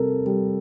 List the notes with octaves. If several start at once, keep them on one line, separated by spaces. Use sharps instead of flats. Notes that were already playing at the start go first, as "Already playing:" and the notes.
Already playing: C3 G3 A4 A#4
G3